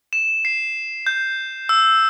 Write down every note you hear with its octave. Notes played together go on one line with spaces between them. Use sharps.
E7
C7
G6
E6